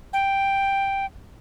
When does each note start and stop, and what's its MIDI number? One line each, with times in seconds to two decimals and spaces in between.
0.13 1.06 79